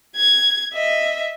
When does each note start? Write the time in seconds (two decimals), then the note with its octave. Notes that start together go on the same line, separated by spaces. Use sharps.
0.16 G#6
0.73 D#5 E5